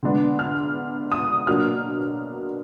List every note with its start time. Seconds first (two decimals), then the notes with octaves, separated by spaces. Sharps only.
0.03 D3 G#3 B3 D4
0.39 F6
1.12 D#6
1.47 B2 F#3 A#3 D4 F6